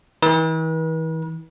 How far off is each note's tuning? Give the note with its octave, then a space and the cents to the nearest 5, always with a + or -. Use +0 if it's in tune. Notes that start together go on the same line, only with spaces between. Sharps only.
E3 -40 B4 -45